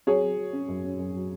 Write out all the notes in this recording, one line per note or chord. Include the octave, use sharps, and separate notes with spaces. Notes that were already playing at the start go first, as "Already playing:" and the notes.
F#3 G#4 C#5
F#3
F#3
C#4
F#2
C#4
F#2
F#3